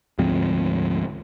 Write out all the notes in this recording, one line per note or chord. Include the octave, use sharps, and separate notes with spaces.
D2 G#2 F3 C4